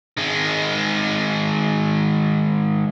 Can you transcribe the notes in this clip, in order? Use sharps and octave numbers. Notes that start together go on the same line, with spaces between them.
D#3 G#3